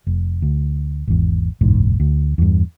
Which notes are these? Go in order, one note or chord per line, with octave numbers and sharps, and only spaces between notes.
F1
D2
G#1 E2
F#1 B1 E2 G#2
D2
E2 G2